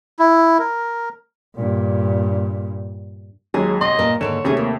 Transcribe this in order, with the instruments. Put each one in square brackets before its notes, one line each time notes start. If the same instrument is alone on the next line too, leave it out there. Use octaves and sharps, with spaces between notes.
[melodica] E4
A#4
[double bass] G2 A#2
[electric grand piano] D#2 [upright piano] F#3 G#3 [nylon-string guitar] G#4
[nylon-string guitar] B2 [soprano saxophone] D#5 [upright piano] C6
[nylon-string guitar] G2 A#2 [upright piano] A#4
[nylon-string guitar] G#2 D#3 A#3 [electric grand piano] D3 [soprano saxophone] C#5 [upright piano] E7
[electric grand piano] D#2 [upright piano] C3 A3 [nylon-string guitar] G3 C#4 G#4
[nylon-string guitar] A#3